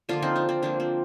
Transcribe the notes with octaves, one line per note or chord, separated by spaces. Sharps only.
D3 F3 A#3 D4 F4
C4 D#4
D4
C4
D3 F3 A#3 D4
C4